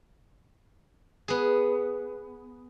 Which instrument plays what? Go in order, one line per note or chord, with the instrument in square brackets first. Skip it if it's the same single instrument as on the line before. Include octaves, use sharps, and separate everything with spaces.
[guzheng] B3 G#4